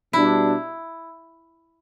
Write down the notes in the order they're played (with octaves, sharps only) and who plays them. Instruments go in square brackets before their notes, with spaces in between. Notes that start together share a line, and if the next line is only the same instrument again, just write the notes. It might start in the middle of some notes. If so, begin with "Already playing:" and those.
[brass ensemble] B2 G3 D4 [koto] E4